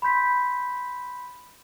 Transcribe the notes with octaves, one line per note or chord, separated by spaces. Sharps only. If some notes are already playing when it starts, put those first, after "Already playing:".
B5 C6 G6 B6